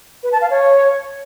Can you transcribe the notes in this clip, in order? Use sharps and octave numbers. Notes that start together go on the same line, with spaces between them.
B4
A5
F5
C#5